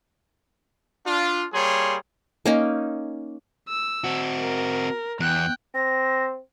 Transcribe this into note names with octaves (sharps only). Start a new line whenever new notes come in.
D4 F4
G3 A#3 G#4 C#5 C6
A#3 C#4 D#4
E6
C4 F#4
A#4
E2 G5 F#6
C4 A#6